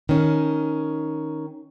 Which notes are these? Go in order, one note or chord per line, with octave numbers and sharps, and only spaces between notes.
D#3 C#4